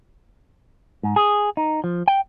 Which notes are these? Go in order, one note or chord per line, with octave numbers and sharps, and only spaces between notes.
G#2
G#4
D#4
F3
G5